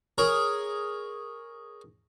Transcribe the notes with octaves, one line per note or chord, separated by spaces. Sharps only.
G#4 A#4 C#5 A#5